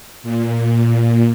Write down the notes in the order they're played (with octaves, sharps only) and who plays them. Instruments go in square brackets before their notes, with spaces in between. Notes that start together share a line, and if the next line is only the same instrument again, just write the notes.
[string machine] A#2